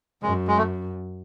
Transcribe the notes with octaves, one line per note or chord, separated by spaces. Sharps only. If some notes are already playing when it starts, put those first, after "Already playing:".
F#2 G#3
G#3
A3